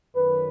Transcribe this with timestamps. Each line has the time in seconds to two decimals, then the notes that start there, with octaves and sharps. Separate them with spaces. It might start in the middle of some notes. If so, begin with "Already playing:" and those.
0.14 F#2 D#3 F#3 B4